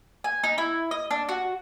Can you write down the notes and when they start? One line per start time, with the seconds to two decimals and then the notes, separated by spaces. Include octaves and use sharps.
0.24 G#5
0.44 D#4
0.58 E4
0.91 D#5
1.11 D4
1.29 F#4